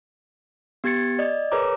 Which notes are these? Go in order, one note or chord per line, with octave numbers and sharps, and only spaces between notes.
B3 G4 G#6 A6 C#7
D5 D#5
G#4 A#4 B4 C#5 A#5 D6